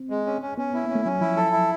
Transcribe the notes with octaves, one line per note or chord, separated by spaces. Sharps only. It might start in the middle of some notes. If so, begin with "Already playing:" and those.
Already playing: C4
G#3
C#4
C#4
B3 C#4
B3 E4
A#3
C#4
A3
F#3 C#4
F3 E4
A4
E4